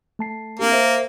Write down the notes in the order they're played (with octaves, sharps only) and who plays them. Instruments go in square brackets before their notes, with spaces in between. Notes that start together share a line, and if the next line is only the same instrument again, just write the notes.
[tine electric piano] A3 A5 C7
[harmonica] A#3 [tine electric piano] C4 D4 G4
[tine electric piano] A#4 C5 E5